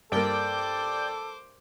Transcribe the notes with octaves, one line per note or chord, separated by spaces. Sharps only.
G2 A#3 A4 C5 D5 G5 D6